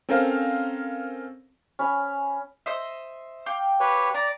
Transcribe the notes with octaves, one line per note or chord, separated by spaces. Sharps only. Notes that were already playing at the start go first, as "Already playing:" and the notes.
C4 C#4 A4 A#4 C5 F5
C#4 B5
C5 D#5 E5
F5 G5 D6
G4 B4 C#5
D5 A#5